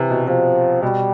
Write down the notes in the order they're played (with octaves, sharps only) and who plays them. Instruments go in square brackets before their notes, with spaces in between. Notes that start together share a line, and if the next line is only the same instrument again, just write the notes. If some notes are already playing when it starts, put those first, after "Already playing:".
Already playing: [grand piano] C3 [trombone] E3
[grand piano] B2
[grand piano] C3 [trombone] F3
[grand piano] B2 [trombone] G3